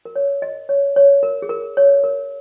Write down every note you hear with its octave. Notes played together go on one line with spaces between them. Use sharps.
A#4
C#5
D#5
C#5
C#5
A#4
G#4
A#4
C#5
A#4